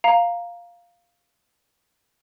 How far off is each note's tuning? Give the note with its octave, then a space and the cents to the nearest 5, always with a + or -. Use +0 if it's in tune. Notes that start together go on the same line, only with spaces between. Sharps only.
F5 +0 A#5 +0